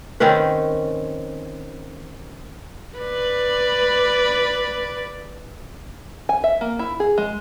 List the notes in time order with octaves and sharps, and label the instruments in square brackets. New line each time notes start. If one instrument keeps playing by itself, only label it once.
[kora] D#3 C4 C#4 B4
[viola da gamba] B4 D5
[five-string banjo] G#5
E5
A#3
E4
G#4
G#3